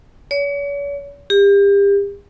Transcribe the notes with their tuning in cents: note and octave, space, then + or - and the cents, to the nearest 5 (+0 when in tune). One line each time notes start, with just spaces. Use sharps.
C#5 +40
G4 +35